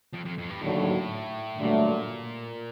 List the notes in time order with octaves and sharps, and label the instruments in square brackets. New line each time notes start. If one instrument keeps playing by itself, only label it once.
[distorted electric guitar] F2
F2
F2
G2
[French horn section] D#2 D3 F#3 [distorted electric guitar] A2
[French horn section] G2 D3 F#3 A3 [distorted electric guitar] A#2